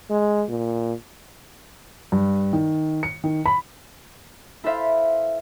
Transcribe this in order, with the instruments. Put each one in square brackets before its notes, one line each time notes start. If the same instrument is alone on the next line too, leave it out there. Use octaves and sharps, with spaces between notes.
[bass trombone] G#3
A#2
[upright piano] G2
D#3
C#7
D#3
B5
[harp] E4 A4 B4 C5 E5 F5